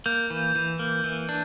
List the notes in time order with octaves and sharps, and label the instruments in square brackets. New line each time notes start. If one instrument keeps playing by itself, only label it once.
[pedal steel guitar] A#3 [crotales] G6
[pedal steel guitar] E3
E3
A#3
E3
D4